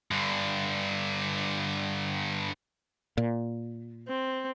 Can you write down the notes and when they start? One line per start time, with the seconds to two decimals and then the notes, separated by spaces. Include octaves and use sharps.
0.11 G2 D3
3.17 A#2
4.09 C4